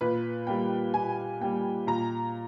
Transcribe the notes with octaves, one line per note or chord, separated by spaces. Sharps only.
A#2 B4
G3 A#3 G5
A#2 G#5
G3 A#3 G5
A#2 A#5